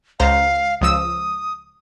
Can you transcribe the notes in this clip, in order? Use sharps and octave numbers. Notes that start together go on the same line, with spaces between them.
C#2 C5 F5 A#5
C#2 F3 D#6 E6